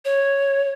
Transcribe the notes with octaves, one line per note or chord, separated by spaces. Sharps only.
C#5